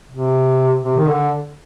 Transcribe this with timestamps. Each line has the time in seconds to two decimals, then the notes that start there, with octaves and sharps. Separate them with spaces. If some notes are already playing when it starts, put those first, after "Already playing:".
0.12 C3
0.84 C3
0.97 D#3
1.08 D3